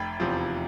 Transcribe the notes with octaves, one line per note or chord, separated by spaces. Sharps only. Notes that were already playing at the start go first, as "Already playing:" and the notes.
Already playing: F1 G5 B5
E2 C3 F3